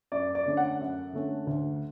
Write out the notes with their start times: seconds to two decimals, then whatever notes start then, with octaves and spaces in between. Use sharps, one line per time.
0.12 F#2 D5
0.35 D5
0.46 D3 A3 C#4
0.57 F#5
0.80 F#2
1.13 D3 A3 C#4
1.47 D2